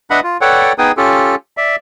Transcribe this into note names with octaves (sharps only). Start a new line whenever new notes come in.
D4 B4 D#5 E5 F#5 B5
F4
A4 B4 C#5 D5 F#5 G5
B3 D#4 G#4 B4 G5 D#6
C#4 F4 G4 A4
D5 E5